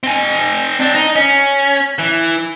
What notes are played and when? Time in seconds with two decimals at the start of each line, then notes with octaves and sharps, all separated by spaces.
0.04 C4 G#5
0.80 C4 D4
0.94 D#4
1.16 C#4
1.99 E3